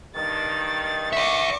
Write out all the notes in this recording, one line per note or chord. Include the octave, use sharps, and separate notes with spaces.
G2 D#3 A6
D5 E5 C#6 D6